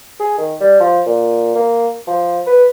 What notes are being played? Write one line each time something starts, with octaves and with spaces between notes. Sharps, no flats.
G#4
D#3
G3
F3
A#2
A#3
F3
B4